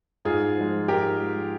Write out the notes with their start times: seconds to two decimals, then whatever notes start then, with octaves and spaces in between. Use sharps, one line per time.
0.25 G#2 F4 G#4
0.57 F3 G#3
0.88 G#2 G4 A#4
1.20 F3 G#3